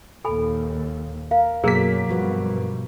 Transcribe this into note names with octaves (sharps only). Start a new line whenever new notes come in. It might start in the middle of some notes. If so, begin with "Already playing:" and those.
D#2 A#2 A4 G#5 B5
A#4 F5
F#2 B2 F#3 A#3 G#4 A#4 A#5 B6
G2 B2 F3 F#4 B4